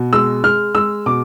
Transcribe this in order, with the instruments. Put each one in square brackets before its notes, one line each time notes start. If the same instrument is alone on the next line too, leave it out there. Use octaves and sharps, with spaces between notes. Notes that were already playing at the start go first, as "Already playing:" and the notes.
Already playing: [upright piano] B2
G#3 E6
G#3 F6
G#3 E6
B2 D6